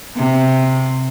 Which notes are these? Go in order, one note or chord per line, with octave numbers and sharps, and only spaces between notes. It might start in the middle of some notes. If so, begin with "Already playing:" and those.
C3